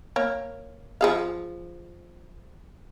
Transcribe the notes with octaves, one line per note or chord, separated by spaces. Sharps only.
A#3 C#5
F3 G#4 F5